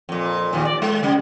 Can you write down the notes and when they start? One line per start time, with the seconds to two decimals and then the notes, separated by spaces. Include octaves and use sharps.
0.09 F2 A#2
0.53 D#2 A#2
0.65 D5
0.82 G#3
1.03 C#3 G3